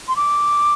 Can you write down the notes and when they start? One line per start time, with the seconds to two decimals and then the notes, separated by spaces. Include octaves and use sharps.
0.08 C6
0.16 D6